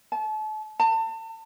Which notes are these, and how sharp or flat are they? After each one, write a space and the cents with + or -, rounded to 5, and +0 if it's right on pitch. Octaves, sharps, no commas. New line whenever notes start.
A5 -35
A5 +35